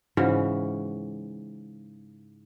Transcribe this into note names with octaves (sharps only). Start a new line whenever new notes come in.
G#2 C#3 E3 F#4